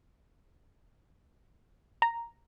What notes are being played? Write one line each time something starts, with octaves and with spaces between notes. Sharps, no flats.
A#5